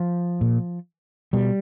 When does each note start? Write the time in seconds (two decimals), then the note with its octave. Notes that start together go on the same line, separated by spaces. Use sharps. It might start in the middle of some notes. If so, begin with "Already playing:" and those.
Already playing: F3
0.41 A#2
1.33 B2 G3